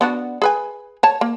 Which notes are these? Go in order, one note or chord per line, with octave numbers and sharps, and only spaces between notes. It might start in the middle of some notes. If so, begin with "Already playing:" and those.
B3 D4 F#4
G#4 B4 G#5
C#5 A5
A#3